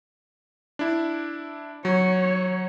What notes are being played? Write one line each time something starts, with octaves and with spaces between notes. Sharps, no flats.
D4 E4
F#3 C#5